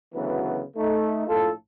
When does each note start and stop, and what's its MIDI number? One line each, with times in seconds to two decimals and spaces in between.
0.15 0.63 38
0.15 0.63 49
0.15 0.63 52
0.15 0.63 54
0.15 0.63 59
0.15 0.63 71
0.77 1.25 57
0.77 1.25 63
1.27 1.52 34
1.27 1.52 45
1.27 1.52 65
1.27 1.52 69